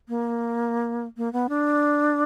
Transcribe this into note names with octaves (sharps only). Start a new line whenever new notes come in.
A#3
A#3
B3
D4